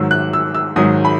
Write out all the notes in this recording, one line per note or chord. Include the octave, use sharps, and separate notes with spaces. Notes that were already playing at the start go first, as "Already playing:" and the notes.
Already playing: G#2 D#3 F#3 E6
F#6
E6
E6
G#2 D#3 F#3 D#6
B5